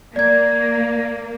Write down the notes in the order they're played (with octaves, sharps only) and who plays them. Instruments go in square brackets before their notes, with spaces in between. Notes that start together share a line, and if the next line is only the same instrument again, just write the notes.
[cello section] A#3 [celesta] D5 G#6